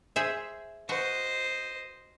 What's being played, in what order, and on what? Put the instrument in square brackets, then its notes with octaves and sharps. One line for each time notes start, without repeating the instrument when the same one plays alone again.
[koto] G#4 C5 E5
[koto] F#4 [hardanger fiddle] C5 D#5